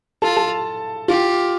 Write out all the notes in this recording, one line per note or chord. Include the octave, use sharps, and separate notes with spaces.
F4 A4 A5
A4 A5
F4 G4 F5